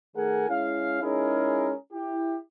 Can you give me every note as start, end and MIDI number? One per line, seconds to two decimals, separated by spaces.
0.16 0.48 51
0.16 0.48 57
0.16 0.48 68
0.16 0.48 70
0.16 0.48 78
0.16 0.48 80
0.49 1.01 56
0.49 1.01 61
0.49 1.01 64
0.49 1.01 77
1.03 1.73 56
1.03 1.73 61
1.03 1.73 63
1.03 1.73 64
1.03 1.73 68
1.03 1.73 70
1.93 2.36 64
1.93 2.36 67